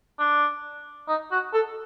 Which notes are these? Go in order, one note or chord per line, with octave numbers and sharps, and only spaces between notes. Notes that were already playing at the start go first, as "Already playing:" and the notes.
D4
D#4
F#4
A4